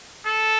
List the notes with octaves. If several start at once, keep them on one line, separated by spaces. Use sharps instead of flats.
A4